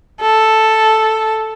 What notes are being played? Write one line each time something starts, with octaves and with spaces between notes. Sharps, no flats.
A4